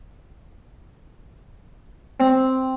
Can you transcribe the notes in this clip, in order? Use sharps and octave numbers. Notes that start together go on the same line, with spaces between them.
C4